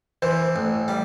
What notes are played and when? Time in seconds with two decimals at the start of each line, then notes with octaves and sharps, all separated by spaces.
0.22 E3 C5
0.56 A1
0.88 G3